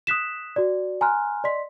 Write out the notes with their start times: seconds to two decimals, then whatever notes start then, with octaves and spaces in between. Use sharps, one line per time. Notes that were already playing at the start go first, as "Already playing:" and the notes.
0.07 D#6 F#6 B6 E7
0.56 F#4 D5
1.01 G#5 A#5 C6 F6 F#6
1.44 D5 D#5 C6 B6